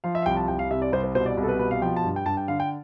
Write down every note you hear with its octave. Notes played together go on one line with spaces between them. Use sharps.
F3 F5
E5
F5
C2 G5
A5
C2 G5
F5
C3 E5
D5
C2 C5
C5
B2 C5
D5
C2
A4
B4
B2 B4
F5
F3 G5
A5
G2
G5
G2 A5
G5
D3 F5
G5